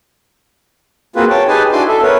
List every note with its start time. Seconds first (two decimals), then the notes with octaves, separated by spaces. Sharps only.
1.16 A#3 C4 F4 F#4 G#4 B4
1.30 C#5 G5 A5
1.48 D#4 G4 G#4 B4 G#5 A5
1.72 D4 E4 F#4 G#5 C6 D6
1.88 A4 E5
2.02 B3 A#4 B4 C#5